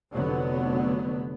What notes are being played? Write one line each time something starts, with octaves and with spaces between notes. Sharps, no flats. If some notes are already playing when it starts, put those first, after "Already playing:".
F1 D3 F#3 B3